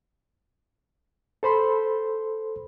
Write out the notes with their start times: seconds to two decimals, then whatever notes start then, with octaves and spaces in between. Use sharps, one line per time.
1.43 A4 C5 B5 C6